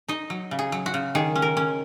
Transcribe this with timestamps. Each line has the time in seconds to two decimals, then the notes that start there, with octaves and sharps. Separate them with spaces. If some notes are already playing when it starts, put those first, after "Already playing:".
0.09 D#4 D#5
0.30 F#3
0.51 C#3
0.59 G#4
0.72 F#3
0.86 F#4
0.94 C#3
1.15 D#3 G#4
1.36 C#4
1.42 A#4
1.57 C#4